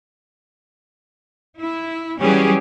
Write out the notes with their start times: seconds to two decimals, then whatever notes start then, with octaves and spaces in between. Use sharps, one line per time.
1.59 E4
2.19 E3 F#3 G3 C#4 G4 G#4